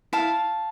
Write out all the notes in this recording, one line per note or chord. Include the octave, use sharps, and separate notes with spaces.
E4 F5 A5